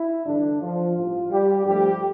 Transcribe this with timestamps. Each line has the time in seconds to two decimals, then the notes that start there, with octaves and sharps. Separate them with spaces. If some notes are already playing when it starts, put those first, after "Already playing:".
Already playing: E4
0.26 G2 D3 E3 G3 D4
0.61 F3 F4
0.96 A1 G2 F3
1.31 G3 G4
1.65 G2 F3 G3 A3 G4